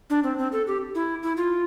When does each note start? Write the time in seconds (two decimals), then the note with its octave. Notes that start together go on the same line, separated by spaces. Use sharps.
0.10 D4
0.24 C4
0.38 C4
0.52 A4
0.67 G4
0.95 E4
1.23 E4
1.37 F4